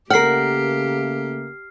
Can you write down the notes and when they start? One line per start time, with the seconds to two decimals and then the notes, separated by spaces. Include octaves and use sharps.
0.10 C#3 A3 A#3 G4 A#4 F#5 F6 C7